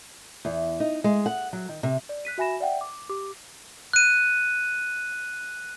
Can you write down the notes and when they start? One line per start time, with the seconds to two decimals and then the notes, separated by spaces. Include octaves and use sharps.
0.45 E2
0.80 D#4
1.04 G#3
1.26 F#5
1.53 F#3
1.69 D#3
1.83 C3
2.09 D5
2.25 F#6 B6 D#7
2.38 F#4 E5 G#5 B5 A#6 E7
2.60 D5 E5 F#5 G5
2.81 D6
3.09 G4 D6
3.93 F#6 D#7